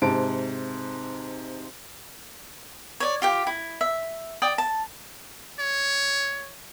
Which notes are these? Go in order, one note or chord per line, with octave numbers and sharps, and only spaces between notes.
G#2 C3 A5 D7
C#5 D5
F4 G4 G5
E4
E5
D5 G5 D#6
A5
C#5